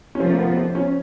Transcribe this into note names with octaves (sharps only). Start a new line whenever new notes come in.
C#4
C3 F3 A3 C4
A#3
B3
C4
C#4